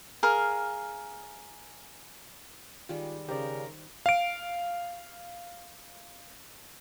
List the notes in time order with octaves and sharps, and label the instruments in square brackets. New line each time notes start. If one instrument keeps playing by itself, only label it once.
[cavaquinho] G#4 A#4 F5
[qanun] D#3 G3 G#3 [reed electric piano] F4
[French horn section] C#3 [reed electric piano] G4 D5 [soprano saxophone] A#4 [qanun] C5
[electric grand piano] F5 D7